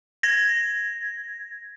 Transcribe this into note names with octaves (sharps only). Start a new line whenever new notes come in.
G#6 A#6